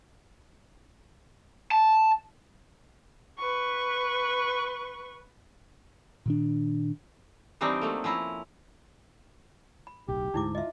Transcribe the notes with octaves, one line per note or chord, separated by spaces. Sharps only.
A5
B4 C#6
A#2 D#3 D4
E3 G3 C4 D4 D#4
F#3 A3 A#3
F3 C#4 E4 A#5
B5
D1 B1 G4
D2 G#2 D#4 E4 D6
F4 D#5 E5